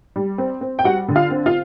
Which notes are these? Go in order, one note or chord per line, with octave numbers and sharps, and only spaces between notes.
G3
C4
C4
G5
G3 F#4 F#5
D3
F4 F5
C4
F4 F5